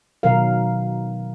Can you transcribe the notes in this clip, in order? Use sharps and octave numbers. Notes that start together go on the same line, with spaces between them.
B2 D#3 F#3 A#4 F5